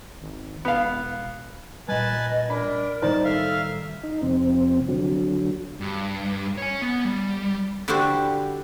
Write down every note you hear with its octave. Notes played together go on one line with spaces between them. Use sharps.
G#1
E1 B3 F5
A#2 G3 B4 D#5 G#5 A5
D4 A#4 B5
A2 D#3 G3 D#4 C5 D5 A5
A4 E5 F5
D#4
F2 C3 C4
D3 F#3
G2
C#5 G#5
B3
G3
D3 G3 E4 F#4 G4 C5